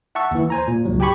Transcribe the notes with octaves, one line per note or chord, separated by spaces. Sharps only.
E5 F#5 A5 C#6 E6
D#2 E3
C5 G#5 A#5
A#2
C#2 G#2 F#3
G4 G5 G#5 B5 C#6 D6